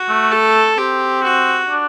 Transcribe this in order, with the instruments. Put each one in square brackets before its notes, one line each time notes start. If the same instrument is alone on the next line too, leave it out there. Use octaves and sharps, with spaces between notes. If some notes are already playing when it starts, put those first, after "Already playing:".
Already playing: [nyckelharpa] F#4
[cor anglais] A3
[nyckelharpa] A4
[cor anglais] C4 [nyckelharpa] G4
[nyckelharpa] F#4
[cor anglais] D4